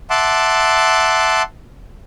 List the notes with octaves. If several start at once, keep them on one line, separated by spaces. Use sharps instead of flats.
E5 F#5 A5 C6 D6